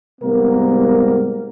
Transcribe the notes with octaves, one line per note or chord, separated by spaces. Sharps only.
G#2 C3 G3 A#3 B3 A#4